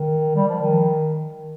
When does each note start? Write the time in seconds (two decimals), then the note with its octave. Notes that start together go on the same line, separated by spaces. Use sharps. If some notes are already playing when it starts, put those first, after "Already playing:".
Already playing: D#3
0.36 G3
0.49 F3
0.61 D#3